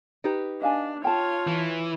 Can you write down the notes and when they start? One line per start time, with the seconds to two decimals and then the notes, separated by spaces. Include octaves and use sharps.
0.24 D#4 G4 B4
0.62 D4 D#5 F5 G#5
1.04 F4 C#5 G5 A5
1.47 E3